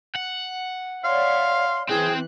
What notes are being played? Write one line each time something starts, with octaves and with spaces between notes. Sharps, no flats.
F#5
C#5 D5 E5 F5 C6
E3 C4 G#4 G5 F#6